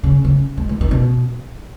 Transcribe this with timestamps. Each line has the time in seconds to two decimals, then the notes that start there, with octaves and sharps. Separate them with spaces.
0.03 C#3
0.25 C#3
0.57 G#3
0.69 E3
0.81 D#3
0.91 B2